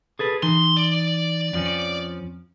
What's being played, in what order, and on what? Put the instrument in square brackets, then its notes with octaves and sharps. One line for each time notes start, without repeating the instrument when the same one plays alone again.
[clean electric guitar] G#4 A4 B4
[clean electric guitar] E3 D#4 [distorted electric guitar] C6
[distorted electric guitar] D5
[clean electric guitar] F2 F3 C#4